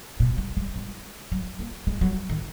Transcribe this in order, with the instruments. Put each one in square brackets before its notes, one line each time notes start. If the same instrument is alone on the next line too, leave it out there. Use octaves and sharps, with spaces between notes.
[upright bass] B2
G#3
G#3
G#3
F#3
A#3
G#3
F#3
D#3